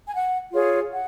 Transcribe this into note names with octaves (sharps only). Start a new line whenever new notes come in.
G#5
F#5
F4 G#4 C#5
F#5